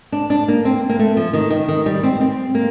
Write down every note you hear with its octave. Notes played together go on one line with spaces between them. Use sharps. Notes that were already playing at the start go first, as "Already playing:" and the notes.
D4
D4
A#3
C4
A#3
A3
F3
D#3
D#3
D#3
G3
C4
C4
A#3